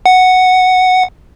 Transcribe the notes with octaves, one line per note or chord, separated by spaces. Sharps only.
F#5